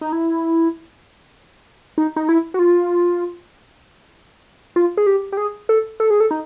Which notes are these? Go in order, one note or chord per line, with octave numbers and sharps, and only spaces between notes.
D#4
E4
D#4
D#4
E4
F#4
F4
F4
G#4
G4
G4
G#4
A4
A4
G#4
A4
D#4